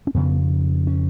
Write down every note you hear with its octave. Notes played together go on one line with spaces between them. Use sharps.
C#4
F2 C#3 B3
C#4